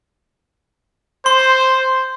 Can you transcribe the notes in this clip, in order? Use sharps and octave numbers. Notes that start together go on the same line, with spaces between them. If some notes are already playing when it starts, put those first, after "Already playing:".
C5 C6